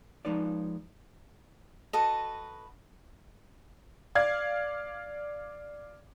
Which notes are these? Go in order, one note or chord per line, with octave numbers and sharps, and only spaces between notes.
F3 G#3 D#4 B4 D5
F#4 A4 B4 D#5
D5 F5 G#6